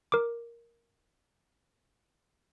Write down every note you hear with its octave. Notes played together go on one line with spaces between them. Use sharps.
A#4 D6